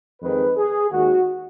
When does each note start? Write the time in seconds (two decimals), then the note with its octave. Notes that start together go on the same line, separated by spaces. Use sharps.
0.22 F2 D#3 G#3 B4
0.57 G#4
0.91 D#2 D#3 G#3 F#4